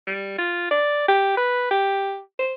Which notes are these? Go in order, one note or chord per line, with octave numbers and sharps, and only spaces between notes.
G3
F4
D5
G4
B4
G4
C5